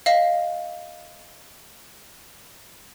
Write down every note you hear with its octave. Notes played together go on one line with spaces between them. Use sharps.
D#5 F5